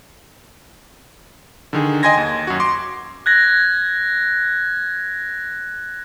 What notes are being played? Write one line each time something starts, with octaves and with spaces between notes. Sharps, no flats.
D3 D#3 G#4
D#5 G5 G#5 C6 G#6 A#6
D#2
F#2 F#4
C6 D6
F#6 G#6 A#6